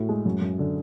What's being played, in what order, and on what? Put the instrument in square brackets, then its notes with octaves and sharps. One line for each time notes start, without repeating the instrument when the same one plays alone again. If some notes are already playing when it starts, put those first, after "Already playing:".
Already playing: [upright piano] A2 F#4
G#3
F#2
F#2
D3